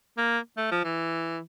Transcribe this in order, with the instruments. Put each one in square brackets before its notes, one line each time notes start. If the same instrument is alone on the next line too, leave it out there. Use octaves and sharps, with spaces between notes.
[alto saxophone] A#3
A3
F3
E3